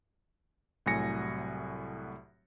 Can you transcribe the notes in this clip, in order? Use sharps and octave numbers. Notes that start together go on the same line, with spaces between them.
C2 A2 F#3 G#5 A#6 C#7